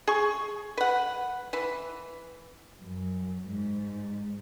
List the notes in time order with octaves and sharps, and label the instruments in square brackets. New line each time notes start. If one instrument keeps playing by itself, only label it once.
[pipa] G#4 C#6
B4 F#5
E3 B4
[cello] F#2
G#2